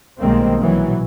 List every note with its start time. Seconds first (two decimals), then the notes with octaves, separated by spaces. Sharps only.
0.18 B1 D#3 G3 G#3 A#3 C4
0.60 A#1 B2 E3 F#3 B3